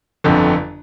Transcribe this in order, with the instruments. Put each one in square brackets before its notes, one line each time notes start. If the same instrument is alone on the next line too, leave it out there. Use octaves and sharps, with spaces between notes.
[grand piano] G1 F2 D3